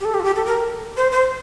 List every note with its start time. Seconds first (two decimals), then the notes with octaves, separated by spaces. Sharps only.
0.01 G4
0.05 A4
0.14 G4
0.20 F4
0.24 G4
0.36 A4
0.46 A#4
0.97 C5
1.12 C5